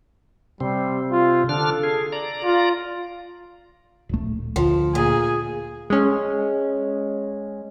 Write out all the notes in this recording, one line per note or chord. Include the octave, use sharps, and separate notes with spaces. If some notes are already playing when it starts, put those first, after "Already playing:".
C3 G3 C4
F4
D3 D4 A4 F6
G#4
D5 A#5
F4
D1 A#1 A3
D2 F3
A#2 G#4
G#3 C#4